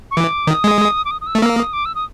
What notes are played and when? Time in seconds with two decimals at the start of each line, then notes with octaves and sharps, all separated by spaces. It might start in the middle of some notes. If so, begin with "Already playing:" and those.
0.11 C#6
0.16 E3 D6
0.47 D#3 D#6
0.64 G#3
1.05 D6
1.11 D#6
1.21 D#6
1.27 E6
1.35 A3
1.41 A#3 E6
1.57 D#6
1.73 D6
1.85 E6
1.95 D#6